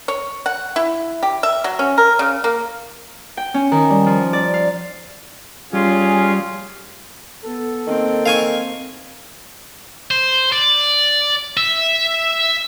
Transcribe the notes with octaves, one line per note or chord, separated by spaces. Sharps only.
C#5
F#5
E4
G4
E5
F#3
C#4
A#4
C#3
A#3
G5
C#4
D#3
G3
F3
D5
F5
G3 C#4 F4 G#4
B3 A4
D#3 A#3 C4
D#3 F5 G#5 C#6
C5
D5
E5